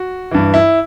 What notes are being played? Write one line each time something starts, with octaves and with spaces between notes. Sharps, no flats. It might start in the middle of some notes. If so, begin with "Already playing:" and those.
Already playing: F#4
G2 E3
E4